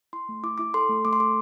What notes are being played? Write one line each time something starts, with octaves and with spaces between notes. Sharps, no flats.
E4 C6
A3
E4 D6
E4 D6
A4 C6
A3
A3 D6
C6
A4 D6